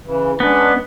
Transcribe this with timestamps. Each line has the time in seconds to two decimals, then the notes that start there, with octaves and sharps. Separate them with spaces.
0.05 C#3 E3
0.40 G#3 B3 C#4 D4